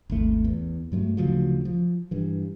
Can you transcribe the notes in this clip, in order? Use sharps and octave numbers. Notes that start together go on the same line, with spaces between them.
G#1 D#2 A3
E2
G2 F#3 G#3 A3
D2 C#3 F3 F#3
F3
G2 E3